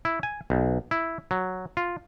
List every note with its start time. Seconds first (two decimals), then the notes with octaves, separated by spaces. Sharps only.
0.05 E4
0.23 G#5
0.50 B1
0.91 E4
1.31 F#3
1.77 F4